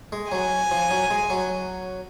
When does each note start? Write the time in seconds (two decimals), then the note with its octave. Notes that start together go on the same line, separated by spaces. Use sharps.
0.12 G#3
0.32 F#3 G#5
0.71 F3
0.91 F#3
1.10 G#3
1.30 F#3